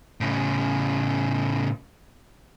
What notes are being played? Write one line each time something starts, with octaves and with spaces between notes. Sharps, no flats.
A2 C#3